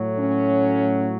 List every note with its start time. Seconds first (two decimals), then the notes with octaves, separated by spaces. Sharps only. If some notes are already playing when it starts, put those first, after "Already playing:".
Already playing: A2 F#3
0.19 C#4